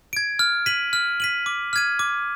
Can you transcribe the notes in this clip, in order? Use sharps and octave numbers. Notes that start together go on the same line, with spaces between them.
G#6 D7
F6
B6 D#7 F#7
F6
B6 D#7 F#7
D6
F6 G#6 D#7
D6